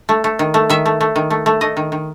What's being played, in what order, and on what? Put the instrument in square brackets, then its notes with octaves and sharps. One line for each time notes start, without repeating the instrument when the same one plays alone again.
[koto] A3
A3
D#3
A3
D#3 E5
A3
A3
D#3
A3
A3
A3 D#5
D#3
D#3